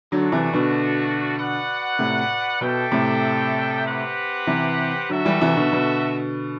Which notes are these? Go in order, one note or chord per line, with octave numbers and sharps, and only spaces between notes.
D3 F#3 A3 D4 F#4
C3 E3
B2 D3
F#4 B4 D5 F#5
A2 C3
B2 D4 A4 E5 G5
A2 C3
C4 G4 B4 F#5
C3 E3
D3 F#3 F#4 A4 E5
E3 G3
C3 E3
B2 D3
B2 D3